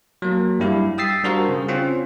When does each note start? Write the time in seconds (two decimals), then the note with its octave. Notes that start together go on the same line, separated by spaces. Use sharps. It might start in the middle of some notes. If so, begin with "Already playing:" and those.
0.22 F#3 A#3
0.60 G2 G3 E4 G4 F5
0.98 G5 D#6 E6 A6 B6 C7
1.24 G3 D4 F#4 A#4 C5 F5
1.49 C#3
1.68 C4 C#4 F4